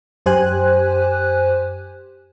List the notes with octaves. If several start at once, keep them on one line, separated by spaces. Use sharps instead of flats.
F#2 G4 C5 G#5 F#6